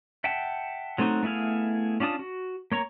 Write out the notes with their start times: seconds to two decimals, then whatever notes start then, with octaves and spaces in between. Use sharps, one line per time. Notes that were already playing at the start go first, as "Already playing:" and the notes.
0.24 E5 F#5 G5 A5
0.98 F#3 A3 C4 D#4 F#4
1.23 A3 B3 E4 G#4 F5
2.00 C#4 D4 F4 A5 D#6
2.19 F#4
2.72 A#3 C#5 A#5 C#6